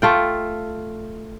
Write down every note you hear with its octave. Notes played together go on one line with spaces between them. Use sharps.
A3 F4 G5